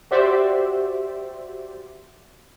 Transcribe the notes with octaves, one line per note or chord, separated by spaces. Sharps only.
F#4 G4 C5 D5 E5